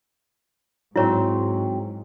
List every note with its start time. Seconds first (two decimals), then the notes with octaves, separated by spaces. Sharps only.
0.96 G#2 F#3 C4 E4 C#5